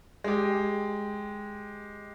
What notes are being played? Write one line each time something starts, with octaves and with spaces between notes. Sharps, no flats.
G#3 G4